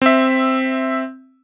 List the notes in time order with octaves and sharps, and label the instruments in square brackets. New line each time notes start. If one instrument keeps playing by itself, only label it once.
[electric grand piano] C4 E5